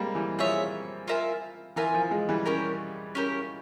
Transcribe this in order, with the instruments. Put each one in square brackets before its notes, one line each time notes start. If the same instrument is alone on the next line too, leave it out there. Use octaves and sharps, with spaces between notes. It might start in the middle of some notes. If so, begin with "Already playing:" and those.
Already playing: [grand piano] G3 G#3 A#3 C4
E3 G3
[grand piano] F3 [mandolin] G#4 C#5 E5
[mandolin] F4 A#4 E5 G#5
[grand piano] E3 [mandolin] F4 A#4 E5 G#5
[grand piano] F3
F3 G#3
E3 G3
[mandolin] C#4 G4 A#4
C#4 G4 A#4